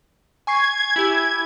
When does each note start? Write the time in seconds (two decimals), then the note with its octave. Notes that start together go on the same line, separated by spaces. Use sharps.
0.47 G#5 C#6 G#6 C7
0.96 E4 G4 G#5